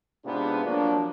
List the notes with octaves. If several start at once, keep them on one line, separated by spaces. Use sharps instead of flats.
G#2 C3 B3 D4 F4
F3 F#3 A#3 D4